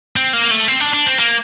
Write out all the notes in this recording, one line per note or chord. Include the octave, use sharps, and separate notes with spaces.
C4
A#3
A3
C4
D4
D4
C4
A#3